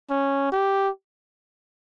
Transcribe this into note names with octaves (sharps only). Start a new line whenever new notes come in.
C#4
G4